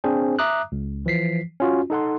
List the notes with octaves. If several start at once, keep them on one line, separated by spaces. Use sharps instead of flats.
C4 D4 G#4 C5 G#5
E5 A#5 D6 D#6 F#6
C#2
E3 F3 B6 C7
C#4 F4 F#4
D#4 A4 F#5 C6